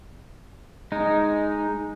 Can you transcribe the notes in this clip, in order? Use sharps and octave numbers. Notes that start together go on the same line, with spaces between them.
G#3 D#4